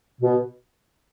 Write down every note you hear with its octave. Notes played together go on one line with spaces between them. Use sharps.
B2